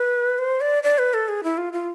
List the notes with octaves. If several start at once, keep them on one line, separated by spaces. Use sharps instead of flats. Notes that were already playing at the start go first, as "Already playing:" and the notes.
Already playing: B4
C5
D5
D5
B4
A4
G#4
E4
F4
F4